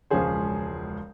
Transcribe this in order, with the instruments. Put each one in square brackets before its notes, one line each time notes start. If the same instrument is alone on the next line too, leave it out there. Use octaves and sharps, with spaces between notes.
[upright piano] E1 C#2 F3 C#4 G#4 C5